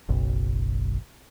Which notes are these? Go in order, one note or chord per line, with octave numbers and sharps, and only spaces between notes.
F#1 B1